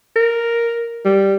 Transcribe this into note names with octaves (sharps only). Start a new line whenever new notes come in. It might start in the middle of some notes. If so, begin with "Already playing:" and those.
A#4
G3